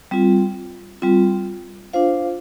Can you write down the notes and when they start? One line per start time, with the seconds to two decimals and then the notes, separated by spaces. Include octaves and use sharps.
0.11 G3 C4 F4
1.02 G3 C4 F4
1.93 D4 F4 C5 F5